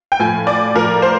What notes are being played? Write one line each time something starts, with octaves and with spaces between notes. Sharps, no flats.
G5
A2 F3 G#5
D5
A2 F3 A#4
C5